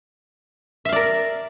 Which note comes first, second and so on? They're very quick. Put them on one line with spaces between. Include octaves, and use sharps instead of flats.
E5 F5 D5 A#4